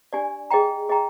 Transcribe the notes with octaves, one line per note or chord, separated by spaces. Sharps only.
D4 G4 D5 G#5
G#4 D#5 G5 A#5
G#4 D#5 G5 A#5